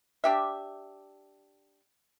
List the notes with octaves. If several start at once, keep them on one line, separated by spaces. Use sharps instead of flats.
D4 G4 E5